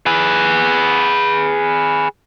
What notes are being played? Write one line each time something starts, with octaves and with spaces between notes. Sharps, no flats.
G#4 B4